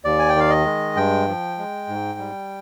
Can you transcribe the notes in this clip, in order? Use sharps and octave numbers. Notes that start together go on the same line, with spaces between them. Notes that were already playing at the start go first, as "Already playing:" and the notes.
D#2 D5
G#5
G5
D#3 F5
D#5
G#3
G2 G5
F3
G#3
G#2
G3